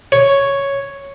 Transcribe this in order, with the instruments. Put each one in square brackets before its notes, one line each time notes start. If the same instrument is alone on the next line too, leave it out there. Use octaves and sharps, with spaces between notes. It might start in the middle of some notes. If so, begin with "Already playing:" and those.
[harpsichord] C#5